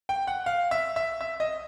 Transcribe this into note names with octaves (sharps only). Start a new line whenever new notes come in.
G5
F#5
F5
E5
E5
E5
D#5